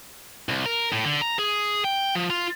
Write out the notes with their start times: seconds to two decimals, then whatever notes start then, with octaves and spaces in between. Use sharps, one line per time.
0.49 C2
0.66 A#4
0.93 A2
1.05 D3
1.21 A#5
1.39 G#4
1.84 G5
2.15 F3
2.30 F4